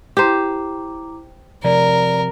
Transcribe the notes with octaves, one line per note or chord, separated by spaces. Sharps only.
E4 G4 C5 A#5 D6
C3 F3 A#4 D5